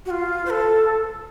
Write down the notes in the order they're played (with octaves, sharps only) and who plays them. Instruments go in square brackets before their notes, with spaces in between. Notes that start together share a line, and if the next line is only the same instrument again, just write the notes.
[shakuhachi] F#4
F4
C5
A4